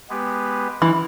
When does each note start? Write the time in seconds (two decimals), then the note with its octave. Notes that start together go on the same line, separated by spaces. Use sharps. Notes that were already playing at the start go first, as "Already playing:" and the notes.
0.09 G#3 B3 G4 B4
0.82 E3